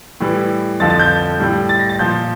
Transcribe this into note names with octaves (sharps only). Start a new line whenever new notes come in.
A2 E3 G3
F2 D3 F3 A6
A6
G6
A2 G3
A6
A#6
A6
A#2 F3 G6